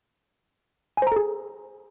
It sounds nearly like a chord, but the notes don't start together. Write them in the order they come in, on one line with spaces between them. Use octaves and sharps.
G#5 C5 A#5 A4 G#4